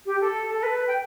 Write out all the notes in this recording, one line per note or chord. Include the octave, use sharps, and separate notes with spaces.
G4
A4
A4
B4
G5